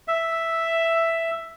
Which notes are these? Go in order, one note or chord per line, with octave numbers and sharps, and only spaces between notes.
E5